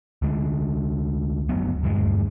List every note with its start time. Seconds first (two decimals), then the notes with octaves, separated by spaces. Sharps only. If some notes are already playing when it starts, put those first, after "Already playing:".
0.22 D2 D3 G#3
1.49 F#1 D2 F#3 B3
1.83 D#1 D2 G2 G#3